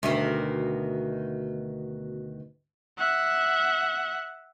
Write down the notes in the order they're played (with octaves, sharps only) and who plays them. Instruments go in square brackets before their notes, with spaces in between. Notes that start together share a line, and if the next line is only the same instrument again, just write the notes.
[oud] D2 B2 D#3
[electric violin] E5 F#5